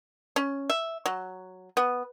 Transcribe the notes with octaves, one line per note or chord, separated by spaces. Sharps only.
C#4
E5
F#3
B3